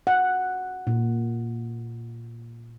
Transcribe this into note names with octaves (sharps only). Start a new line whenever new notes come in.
F#5
A#2